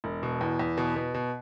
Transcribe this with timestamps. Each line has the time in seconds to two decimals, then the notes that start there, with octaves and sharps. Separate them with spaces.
0.04 E1
0.23 B2
0.41 E2
0.59 E2
0.77 B2
0.96 B2
1.14 B2